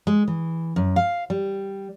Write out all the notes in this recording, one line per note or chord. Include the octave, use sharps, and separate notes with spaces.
G#3
E3
F#2
F5
G3